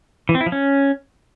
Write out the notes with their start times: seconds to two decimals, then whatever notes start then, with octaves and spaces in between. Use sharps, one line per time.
0.29 E3
0.35 C4
0.41 E4
0.46 F3
0.52 C#4